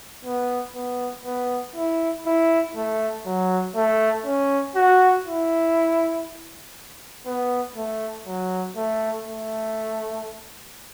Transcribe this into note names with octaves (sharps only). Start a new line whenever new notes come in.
B3
B3
B3
E4
E4
A3
F#3
A3
C#4
F#4
E4
B3
A3
F#3
A3
A3